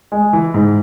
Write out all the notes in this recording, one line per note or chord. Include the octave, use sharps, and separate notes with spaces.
G#3
E3
G#2